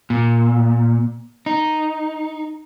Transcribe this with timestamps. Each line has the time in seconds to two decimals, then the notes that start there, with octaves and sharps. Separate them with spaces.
0.10 A#2
1.46 D#4